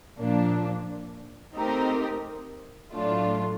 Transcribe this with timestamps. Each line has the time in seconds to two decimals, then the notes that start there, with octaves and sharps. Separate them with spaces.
0.18 A#2 F3 A#3 D4
1.55 A3 C4 D#4 G4 A#4
2.92 A2 F#3 A3 D4 F4